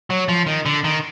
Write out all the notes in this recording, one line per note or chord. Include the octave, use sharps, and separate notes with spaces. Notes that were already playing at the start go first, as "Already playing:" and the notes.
F#3
F3
D#3
D3
D#3